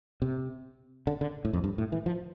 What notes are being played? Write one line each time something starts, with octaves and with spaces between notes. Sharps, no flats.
C3
D3
D3
A2
F2
G2
A2
E3
F3